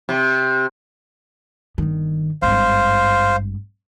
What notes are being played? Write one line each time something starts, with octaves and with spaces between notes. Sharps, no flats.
C3
G1 D#3
G#1 G2 C5 F5